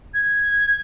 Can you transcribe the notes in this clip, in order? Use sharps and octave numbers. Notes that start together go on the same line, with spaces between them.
G#6